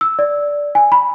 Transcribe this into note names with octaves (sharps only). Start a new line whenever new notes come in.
E6
D5
G#5
B5